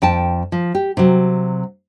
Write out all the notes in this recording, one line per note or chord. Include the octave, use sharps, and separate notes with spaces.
F2 G5 A5
F3
G4
C3 F#3